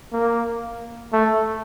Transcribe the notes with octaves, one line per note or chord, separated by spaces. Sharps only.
A#3
A3